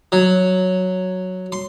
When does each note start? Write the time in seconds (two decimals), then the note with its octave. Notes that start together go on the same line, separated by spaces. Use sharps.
0.12 F#3
1.52 C6